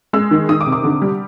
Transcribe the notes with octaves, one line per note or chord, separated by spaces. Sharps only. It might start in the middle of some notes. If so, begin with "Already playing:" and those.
G#3 E6
D#3
D#3 D#6
D6
C3
D6
D3
G3